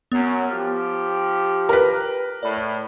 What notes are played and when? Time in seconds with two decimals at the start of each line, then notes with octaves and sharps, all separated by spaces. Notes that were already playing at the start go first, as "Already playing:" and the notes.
0.12 F#2 B3
0.51 F3 G4 F6
1.69 A#4 B4
2.43 A2 D5 B5